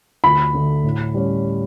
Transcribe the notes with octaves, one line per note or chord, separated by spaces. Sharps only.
D2 B5
D3 A3
A2
G3 C#4